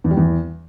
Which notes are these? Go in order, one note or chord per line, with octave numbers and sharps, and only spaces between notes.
E2
G3
E2